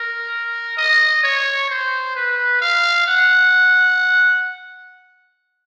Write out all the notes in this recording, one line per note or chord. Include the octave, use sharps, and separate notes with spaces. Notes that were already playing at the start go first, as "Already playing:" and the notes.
Already playing: A#4
D#5
C#5
C5
B4
F5
F#5